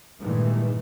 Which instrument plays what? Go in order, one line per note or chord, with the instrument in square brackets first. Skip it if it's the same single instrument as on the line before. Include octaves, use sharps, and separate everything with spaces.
[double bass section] G2 A#2 D#3 E3 G#3 A3